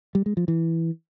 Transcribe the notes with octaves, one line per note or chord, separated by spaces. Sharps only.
G3
G#3
F3
E3